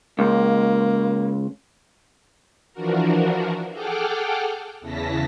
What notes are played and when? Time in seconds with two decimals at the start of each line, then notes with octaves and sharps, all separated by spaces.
0.19 C#2 A#3
2.73 E3 F3 D4 F#4 A#4
3.72 G#4 A4 F#5 G5 D6 F6
4.81 E2 C#3 E3 A5 A#6 B6